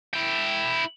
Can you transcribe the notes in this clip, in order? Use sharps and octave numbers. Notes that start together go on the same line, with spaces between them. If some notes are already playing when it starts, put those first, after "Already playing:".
E4 G5